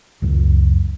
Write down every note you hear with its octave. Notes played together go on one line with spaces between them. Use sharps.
C#2 F#2